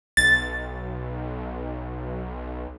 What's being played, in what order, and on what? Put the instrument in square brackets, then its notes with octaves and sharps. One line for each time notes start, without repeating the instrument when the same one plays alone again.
[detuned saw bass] B1 [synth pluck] A6